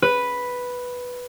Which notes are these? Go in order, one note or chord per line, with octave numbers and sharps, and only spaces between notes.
B4